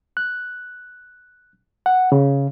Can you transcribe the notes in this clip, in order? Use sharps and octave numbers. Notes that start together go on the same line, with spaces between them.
F#6
F#5
C#3